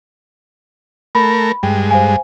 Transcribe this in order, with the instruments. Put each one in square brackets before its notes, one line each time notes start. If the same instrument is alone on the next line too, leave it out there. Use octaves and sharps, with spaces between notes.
[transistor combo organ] A3 A#4 [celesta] B5
[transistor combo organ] G2 G#3 [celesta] G5
[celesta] C5 F5 G#5